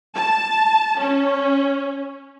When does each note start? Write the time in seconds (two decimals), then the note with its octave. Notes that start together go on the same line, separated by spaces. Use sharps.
0.14 A5
0.99 C#4